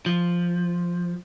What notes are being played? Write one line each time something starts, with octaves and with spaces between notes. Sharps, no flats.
F3